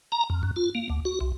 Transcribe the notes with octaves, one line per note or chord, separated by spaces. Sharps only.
A#5
F2
F#2
F4
A#3
D2
F#4
C2